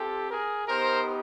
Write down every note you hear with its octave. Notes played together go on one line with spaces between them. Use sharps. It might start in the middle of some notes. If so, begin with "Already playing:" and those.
Already playing: C4 F4 G4 A4
G#4 A#4
B3 D#4 G4 A#4 C5